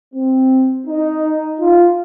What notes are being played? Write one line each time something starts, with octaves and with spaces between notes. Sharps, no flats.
C4
D#4
F4